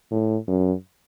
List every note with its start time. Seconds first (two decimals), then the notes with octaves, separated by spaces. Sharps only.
0.11 A2
0.48 F#2